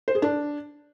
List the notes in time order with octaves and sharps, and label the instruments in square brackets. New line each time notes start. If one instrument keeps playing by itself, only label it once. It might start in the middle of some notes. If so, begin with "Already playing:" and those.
[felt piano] C5
G#4
D4